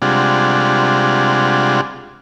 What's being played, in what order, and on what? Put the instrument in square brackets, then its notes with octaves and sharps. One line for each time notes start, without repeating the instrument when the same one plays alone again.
[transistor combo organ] C3 G3 G#3 D4 F4 F#5